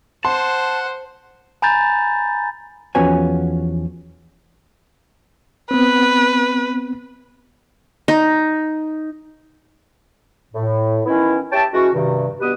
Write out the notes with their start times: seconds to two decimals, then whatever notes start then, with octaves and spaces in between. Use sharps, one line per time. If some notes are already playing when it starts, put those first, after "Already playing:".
0.25 C5 F#5 A5 C6
1.62 G#5 A#5 B5 G6 A6
2.95 E2 F3 B3 C#4 F#4 G#5
5.71 B3 C4 B4
8.08 D#4
10.54 A2
11.06 D#3 B3 C#4 E4
11.52 G4 C#5 E5 G5 A5
11.73 E3 G#3 C#4 F#4
11.94 G2 C3 D#3
12.41 G2 B2 B3 G4 B4 D#6